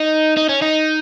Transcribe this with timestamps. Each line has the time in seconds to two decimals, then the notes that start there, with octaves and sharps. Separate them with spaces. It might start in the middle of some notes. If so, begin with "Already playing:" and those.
Already playing: D#4
0.37 D#4
0.49 C#4
0.62 D#4